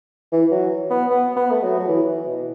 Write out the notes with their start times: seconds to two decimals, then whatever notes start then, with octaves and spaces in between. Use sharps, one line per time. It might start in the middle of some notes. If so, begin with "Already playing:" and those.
0.32 E3
0.51 F#3
0.91 B3
1.10 B3
1.36 B3
1.50 A3
1.63 F#3
1.79 F#3
1.88 E3
2.08 E3
2.27 B2